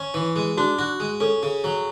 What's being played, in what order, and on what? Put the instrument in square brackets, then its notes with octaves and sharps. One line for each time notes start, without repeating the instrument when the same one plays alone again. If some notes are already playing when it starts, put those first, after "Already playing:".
Already playing: [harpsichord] C#4
E3
G#3
[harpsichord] D4 [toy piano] F#4
[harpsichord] F#4
G#3
[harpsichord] C#4 [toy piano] A4
[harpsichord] C#3
F#3